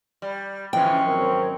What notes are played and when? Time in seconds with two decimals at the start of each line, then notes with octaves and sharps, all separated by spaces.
0.22 G3
0.73 D3 E3 F3 G#3 C#4 G5
1.07 G#1 F#3 C4 A#4